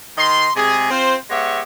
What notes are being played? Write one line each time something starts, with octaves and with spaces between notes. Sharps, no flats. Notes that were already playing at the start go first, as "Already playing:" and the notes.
D#3 D#5 C6
C3 G#3 G#4
C4 F4 C5
G#3 B3 G4 C#5 E5